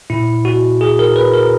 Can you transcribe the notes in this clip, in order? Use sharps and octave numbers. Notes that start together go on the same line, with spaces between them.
A#2 E4
F#4
G#4
A#4
B4
A#4